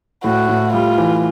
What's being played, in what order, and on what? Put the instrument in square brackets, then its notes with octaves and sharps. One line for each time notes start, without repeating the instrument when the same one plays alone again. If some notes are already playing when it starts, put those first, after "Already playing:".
[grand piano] A2 [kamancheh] F#4
[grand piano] A2
[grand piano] G3 [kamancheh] F4
[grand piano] E3